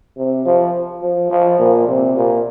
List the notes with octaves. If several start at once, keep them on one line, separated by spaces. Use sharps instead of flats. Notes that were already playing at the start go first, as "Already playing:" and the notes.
C3
F3
F3
F3
A#2
C3
A#2